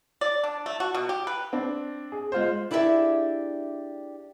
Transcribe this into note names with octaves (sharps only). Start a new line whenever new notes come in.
D5
D4
A3
F#4
B2
G4
B4
C4 D4
G#4
G#3 F4 C5
D4 E4 G4 G#4 B4 E5